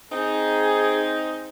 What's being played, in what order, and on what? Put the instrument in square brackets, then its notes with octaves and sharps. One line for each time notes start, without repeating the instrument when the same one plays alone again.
[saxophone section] C4 D#4 [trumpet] G#4